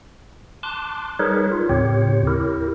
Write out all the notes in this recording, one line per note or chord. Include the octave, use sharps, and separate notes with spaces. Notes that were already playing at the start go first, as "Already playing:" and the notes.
A5 C6 D6 F#6
G3 D#4 G#4 A#4 B4 C#5
F4
D#2 A2 C#3 C4 G4 C#5
E4 G4 A#4